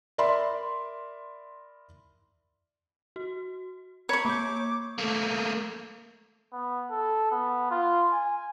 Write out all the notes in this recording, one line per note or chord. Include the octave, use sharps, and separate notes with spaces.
A#4 D5 E5 B5 C6
F#4
C#5 A#5 B5 C#6
A#3 D6 G6
A3 A#3
B3
A4
B3
F4
G#5